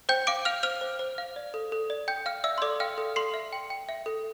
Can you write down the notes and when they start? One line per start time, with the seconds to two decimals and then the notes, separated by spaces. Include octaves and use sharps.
0.09 C5 G5 G6
0.27 F5 D6 D7
0.45 F5 F6 F7
0.63 C5 F6 F7
0.81 C5
0.99 C5
1.18 F5
1.36 D5
1.54 A4
1.72 A4
1.90 D5
2.08 D5 G5 G6
2.26 F5 F6
2.44 D5 E5 E6
2.58 C6
2.62 A4 D5 D6
2.80 F5 G5 F6
2.98 A4
3.16 A4 C6 C7
3.34 E5
3.53 G5
3.70 G5
3.89 E5
4.06 A4